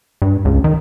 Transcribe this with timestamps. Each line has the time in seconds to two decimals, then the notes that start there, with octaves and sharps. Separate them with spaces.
0.22 G2
0.45 C#2
0.64 D#3